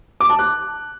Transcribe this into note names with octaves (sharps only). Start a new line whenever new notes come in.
D6
A5
F#6